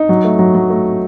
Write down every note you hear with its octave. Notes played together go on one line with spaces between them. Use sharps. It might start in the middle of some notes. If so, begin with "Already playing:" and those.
Already playing: D#4
F#3
A3
F#3
F#3
A3